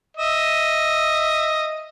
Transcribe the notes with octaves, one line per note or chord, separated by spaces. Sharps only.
D#5 E5